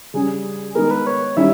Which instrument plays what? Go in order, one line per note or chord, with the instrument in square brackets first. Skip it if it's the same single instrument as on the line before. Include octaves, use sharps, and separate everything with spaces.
[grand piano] C#3 G3 C#4 [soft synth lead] G#4
[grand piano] D#3 G#3 B3 [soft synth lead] A#4
[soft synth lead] B4
C#5
[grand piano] D#3 G3 C#4 E4 [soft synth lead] E5